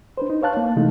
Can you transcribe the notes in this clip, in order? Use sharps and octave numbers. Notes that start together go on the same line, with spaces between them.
D4 B4 C5
D#4
B4 C#5 F5 A5 F#6
A#3
C3 E3 G#3 A3 D#4 A4